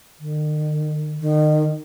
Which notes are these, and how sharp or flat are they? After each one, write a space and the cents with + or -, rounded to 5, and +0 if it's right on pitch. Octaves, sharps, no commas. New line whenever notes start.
D#3 -45
D#3 -30